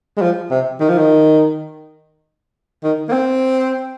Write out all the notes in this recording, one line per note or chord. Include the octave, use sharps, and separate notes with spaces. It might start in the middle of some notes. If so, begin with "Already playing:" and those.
G#3
F3
C3
D#3
F3
D#3
D#3
A#3
C4